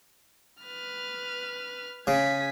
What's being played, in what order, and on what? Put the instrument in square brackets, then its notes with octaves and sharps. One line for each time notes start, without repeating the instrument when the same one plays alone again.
[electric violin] B4 F6
[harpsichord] C#3 [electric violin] G#5 B6